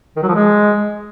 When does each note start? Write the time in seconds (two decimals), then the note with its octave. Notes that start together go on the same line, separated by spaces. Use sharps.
0.17 D#3
0.23 F#3
0.29 F3
0.35 G#3